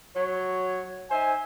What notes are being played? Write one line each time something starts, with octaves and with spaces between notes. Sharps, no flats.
F#3 C#5
D#4 C5 E5 G#5